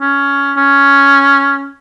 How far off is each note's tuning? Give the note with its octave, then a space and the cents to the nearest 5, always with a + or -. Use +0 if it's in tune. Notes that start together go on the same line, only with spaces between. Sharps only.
C#4 +10
C#4 +5